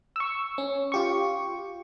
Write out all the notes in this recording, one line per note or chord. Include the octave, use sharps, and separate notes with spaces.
C#6 E6
C#4
F4 G4 C#6